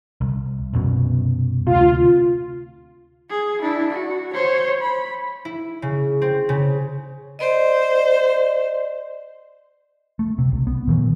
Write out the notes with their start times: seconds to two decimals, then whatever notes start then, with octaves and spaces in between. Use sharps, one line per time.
0.21 C2
0.73 C2 F#2 B2
1.67 D2 C3 F4
3.30 G#4
3.62 D4 E4
3.91 F#4
4.33 C5 C#5
4.81 B5
5.45 E4
5.82 C#3
6.22 C4
6.49 C#3
7.39 C5 D5 D#5
10.19 A3
10.38 C3
10.52 C2
10.67 B3
10.87 A#2 D#3 E3 F#3